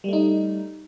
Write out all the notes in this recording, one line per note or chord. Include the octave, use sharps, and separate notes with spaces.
G3 A3 D#4